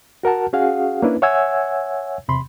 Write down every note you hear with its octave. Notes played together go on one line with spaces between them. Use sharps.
F#4 A#4 F#5 A5
C#4 F#4 G#4 F5 F#5
A#3 C#4 D4 E4 B4
C#5 E5 F#5 G#5 E6 G#6
E2 C3 B5 C6